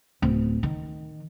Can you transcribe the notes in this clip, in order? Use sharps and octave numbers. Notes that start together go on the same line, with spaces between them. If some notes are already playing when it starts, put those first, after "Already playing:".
D1
D#3